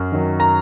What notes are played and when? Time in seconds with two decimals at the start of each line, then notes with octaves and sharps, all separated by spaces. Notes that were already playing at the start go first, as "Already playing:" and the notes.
Already playing: F#2
0.12 D#3 F#3
0.40 A#5